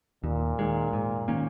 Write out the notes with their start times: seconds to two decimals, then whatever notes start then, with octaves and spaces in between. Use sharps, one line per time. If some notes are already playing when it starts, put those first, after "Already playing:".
0.24 D#2 A#2
0.59 D#3 G#3
0.93 G#2
1.28 D#3 A#3 C#4